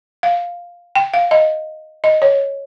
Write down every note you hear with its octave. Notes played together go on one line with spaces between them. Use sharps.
F5
G5
F5
D#5
D#5
C#5